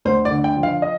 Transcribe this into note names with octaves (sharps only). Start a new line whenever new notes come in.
D2 C5
D5
D3
G5
F3
F5
D#5